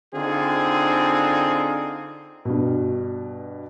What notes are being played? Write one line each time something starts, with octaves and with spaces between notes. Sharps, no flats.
D3 C4 D#4 F4 G#4
G2 B2